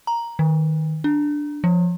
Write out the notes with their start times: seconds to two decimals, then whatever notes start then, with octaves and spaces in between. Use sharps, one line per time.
0.07 A#5
0.39 D#3
1.04 D4
1.64 F3